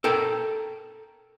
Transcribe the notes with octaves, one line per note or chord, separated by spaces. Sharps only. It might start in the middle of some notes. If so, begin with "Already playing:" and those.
A4 A#4 G5